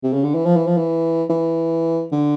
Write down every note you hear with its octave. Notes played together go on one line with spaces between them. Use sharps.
C3
C#3
D3
E3
F3
E3
F3
E3
E3
D3